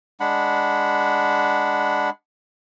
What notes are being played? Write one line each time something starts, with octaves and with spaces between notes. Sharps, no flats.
G#3 D4 F#5 B5